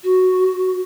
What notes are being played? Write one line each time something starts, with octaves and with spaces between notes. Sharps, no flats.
F#4